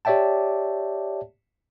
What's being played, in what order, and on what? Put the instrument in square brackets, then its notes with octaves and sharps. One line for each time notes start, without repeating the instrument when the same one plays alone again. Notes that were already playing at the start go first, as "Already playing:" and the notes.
[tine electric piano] G4 C#5 D5 E5 G5 A5